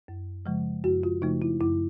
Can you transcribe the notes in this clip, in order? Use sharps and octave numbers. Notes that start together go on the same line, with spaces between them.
F#2
C#3 F3 G#3
F#2 F#4
F4
C#3 F3 A3 D#4
E4
F#2 E4